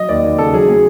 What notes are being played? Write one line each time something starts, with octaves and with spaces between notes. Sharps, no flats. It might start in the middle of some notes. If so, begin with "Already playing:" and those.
Already playing: F#3 D#5
D#2 D5
D#2
C#3 A4
F#3 G#4
A3 G#4